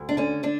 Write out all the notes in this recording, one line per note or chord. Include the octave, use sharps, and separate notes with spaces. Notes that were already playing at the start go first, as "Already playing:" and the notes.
Already playing: D2
D4
D3 C#4
D3 D4